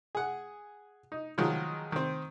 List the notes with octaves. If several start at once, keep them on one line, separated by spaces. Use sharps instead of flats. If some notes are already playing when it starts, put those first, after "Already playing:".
G#4 F#5
D#4
D#3 F3 F#3 G#3
D#3 C4